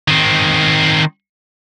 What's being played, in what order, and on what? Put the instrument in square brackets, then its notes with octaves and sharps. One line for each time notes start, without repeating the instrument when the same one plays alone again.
[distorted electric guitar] D#3 C4